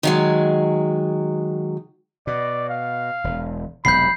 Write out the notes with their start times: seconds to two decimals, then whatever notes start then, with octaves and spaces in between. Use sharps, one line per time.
0.03 D#3 F#3 G#3
2.27 B2 D5
2.69 F5
3.24 E1
3.85 E1 B1 C3 B5 G6 C7